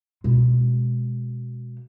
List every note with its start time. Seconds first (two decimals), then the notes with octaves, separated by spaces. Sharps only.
0.24 B2 G#3